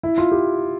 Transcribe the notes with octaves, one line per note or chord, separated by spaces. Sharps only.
E4
F4
G4